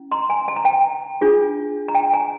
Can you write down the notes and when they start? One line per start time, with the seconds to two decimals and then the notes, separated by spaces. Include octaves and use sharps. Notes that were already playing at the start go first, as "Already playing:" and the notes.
Already playing: C#4 E4
0.12 A#5 C6
0.30 G#5 A#5
0.48 A5
0.56 A#5
0.65 G5 A5
1.21 D4 F4 G#4
1.88 A#5
1.95 G5 A5
2.13 G#5 A#5